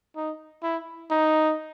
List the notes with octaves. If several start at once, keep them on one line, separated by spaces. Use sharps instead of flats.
D#4
E4
D#4